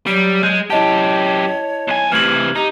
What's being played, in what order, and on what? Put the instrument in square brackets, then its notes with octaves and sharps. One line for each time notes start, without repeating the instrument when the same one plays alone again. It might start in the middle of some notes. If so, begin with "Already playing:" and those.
[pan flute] F#3 [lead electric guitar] G3
[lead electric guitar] G#3 [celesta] G6
[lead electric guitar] F#2 G4 [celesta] E4 D#5 A5 [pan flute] C#5
[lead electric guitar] B1 G#5
[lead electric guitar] C3 E3 [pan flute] A3 [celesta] F6 G#6 F#7
[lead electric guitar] D#4 [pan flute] G4